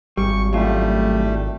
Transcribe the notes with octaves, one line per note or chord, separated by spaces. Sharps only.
G#1 G3 C#6
F#2 A2 G3 A3 F4